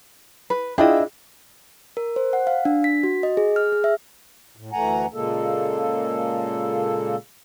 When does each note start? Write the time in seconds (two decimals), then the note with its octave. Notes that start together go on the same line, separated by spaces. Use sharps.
0.50 B4
0.78 D4 E4 F4 G#4 D#5 G5
1.97 A#4
2.16 C5
2.33 F#5
2.47 F5
2.65 D4
2.84 B6
3.03 F#4
3.23 D#5
3.37 G#4
3.56 F6
3.72 G#4
3.84 E5
4.56 A2
4.73 D2 E3 A3 F#5 G#5 A#5
5.14 A#2 C#3 G#3 A#3 A4